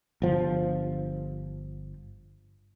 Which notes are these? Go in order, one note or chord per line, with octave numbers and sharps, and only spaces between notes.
G1 F3